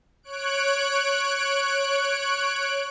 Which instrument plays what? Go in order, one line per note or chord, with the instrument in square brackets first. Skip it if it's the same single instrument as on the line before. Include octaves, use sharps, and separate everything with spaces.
[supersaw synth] C#5 F#6 D7